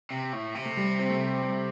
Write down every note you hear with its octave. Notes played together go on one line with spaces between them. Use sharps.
C3
A2
C3
A3
G3
C4
A3
G3